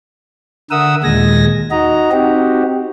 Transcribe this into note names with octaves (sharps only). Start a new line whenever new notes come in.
D3 A#4 E5 F#5 D#6 E6
D#2 A#2 G#3 G#5 A#6
D#4 F#4 D#5 A#5
C4 D#4 F#4 G4